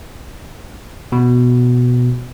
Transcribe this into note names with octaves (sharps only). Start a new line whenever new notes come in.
B2